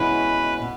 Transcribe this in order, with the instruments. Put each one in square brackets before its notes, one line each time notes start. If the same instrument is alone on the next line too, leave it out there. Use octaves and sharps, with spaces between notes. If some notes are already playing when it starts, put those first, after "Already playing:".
Already playing: [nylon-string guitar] B2 G#3 C#4 E4 [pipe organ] B4
[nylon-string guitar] B2